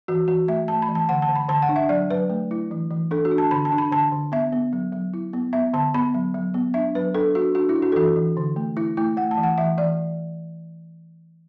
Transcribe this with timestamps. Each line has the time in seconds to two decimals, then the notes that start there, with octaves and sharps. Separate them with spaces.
0.08 E3 F#4
0.28 E3 F#4
0.48 A3 E5
0.68 A3 A5
0.82 B5
0.89 E3
0.95 A5
1.09 D3 F#5
1.22 A5
1.29 D3
1.36 B5
1.49 D3 A5
1.62 F#5
1.69 D4
1.76 E5
1.89 F#3 D5
2.10 F#3 B4
2.30 A3
2.51 E4
2.71 E3
2.91 E3
3.11 D4 A4
3.25 F#4
3.31 D4
3.38 A5
3.51 D3 B5
3.65 A5
3.72 D4
3.78 B5
3.91 D3 A5
4.12 D3
4.32 B3 E5
4.53 B3
4.73 F#3
4.92 F#3
5.14 E4
5.33 B3
5.53 B3 E5
5.73 D3 A5
5.94 B3 B5
6.14 F#3
6.34 F#3
6.54 B3
6.74 D4 E5
6.95 F#3 B4
7.14 D4 A4
7.35 D4 F#4
7.55 D4 F#4
7.69 E4
7.76 D4
7.82 F#4
7.92 A4
7.95 E3 F#4
8.16 E3
8.37 D3
8.56 A3
8.77 E4
8.97 A3 E4
9.17 A3 F#5
9.31 A5
9.37 E3
9.43 F#5
9.58 E3 E5
9.78 E3 D5